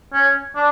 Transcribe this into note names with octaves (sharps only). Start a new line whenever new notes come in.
C#4
D4